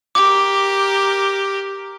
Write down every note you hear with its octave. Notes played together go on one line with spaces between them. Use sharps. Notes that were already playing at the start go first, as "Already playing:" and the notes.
G4 A#4 D6